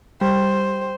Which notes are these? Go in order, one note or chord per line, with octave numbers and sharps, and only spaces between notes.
G3 C5